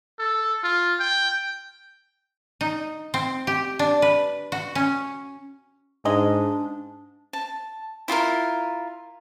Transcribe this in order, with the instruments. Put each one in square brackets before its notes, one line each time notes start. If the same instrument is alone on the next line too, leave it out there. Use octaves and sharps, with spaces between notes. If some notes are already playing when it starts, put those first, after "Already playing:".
[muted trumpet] A4
F4
G5
[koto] D#4
C4
G4
D4
B4
F#4
C#4
[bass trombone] G#2 [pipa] G#3 D#5 [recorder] D4
[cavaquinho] A5
E4 F4 G#4 A#4